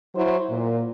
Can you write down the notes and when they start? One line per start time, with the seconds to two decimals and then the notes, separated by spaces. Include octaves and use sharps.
0.15 F#3 E4 C5
0.50 A#2